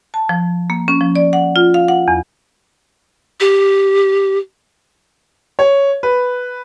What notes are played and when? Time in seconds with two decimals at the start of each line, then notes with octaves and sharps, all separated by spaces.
0.14 A5
0.29 F3
0.70 A#3
0.88 C#4
1.01 F3
1.15 D5
1.33 F#5
1.56 F4
1.74 F5
1.88 F#5
2.08 E2
3.40 G4
5.59 C#5
6.03 B4